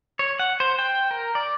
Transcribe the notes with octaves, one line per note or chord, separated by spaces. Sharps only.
C#5
F#5
C5
G5
A#4
D5